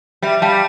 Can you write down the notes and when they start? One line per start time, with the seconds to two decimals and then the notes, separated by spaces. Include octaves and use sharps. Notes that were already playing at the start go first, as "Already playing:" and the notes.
0.22 G3 E5 G5
0.42 G3 F5 A5